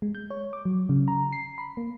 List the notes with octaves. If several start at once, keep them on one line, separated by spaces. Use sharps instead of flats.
G#3
G6
C#5
D6
F#3
C#3
A#5
C7
B5
A#3